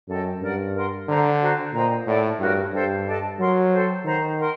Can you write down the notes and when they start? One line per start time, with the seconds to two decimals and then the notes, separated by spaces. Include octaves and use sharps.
0.08 F#2 A4 D#5 G5
0.42 G2 A#4 D5 F#5
0.74 A#4 F#5 C6
1.08 D3 C5 F#5 A#5
1.41 F#4 C5 G5 A#5
1.73 A#2 C5 D#5 G5 A#5
2.07 A2 A4 D5 F#5
2.39 G2 F#4 A#4 F#5
2.72 G2 A4 C5 G5
3.06 D4 A4 D#5 A5
3.39 F#3 A#4 F#5 C6
3.73 A4 C5 G5 C6
4.05 D#3 C5 F#5 A#5
4.38 A#4 F#5 C6